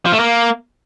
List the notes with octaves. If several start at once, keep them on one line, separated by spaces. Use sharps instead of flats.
F3
A3
A#3